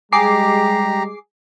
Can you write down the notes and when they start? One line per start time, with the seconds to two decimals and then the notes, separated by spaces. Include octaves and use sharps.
0.12 G3 G#3 G4 G#4 A#5 D6 C7